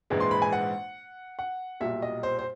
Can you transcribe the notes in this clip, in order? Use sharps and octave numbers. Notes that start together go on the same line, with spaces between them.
A#1 G#2 E3 G#3
C6
B5
G#5
F#5
F#5
B1 A#2 G3 E5
D#5
C5
C5